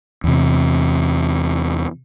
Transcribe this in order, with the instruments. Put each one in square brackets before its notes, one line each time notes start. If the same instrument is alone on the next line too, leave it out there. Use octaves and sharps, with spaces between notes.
[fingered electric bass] E2 C3